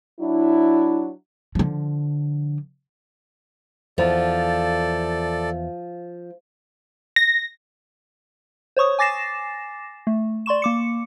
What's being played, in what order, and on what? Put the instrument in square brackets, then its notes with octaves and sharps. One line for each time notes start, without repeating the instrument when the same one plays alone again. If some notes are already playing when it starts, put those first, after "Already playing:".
[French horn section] F#3 D4 E4
[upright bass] D3 F3
[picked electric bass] E2 [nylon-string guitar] F3 [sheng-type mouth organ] A4 D5
[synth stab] A#6
[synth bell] C5 C#5 C#6 D#6
G#5 D6 A6 A#6 C7 E7
A3
D5 C6 C#6 E7
A#3 D6 C#7